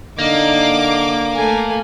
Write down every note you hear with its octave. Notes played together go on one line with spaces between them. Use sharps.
D3 A#3 D#4 D6
A3 G#5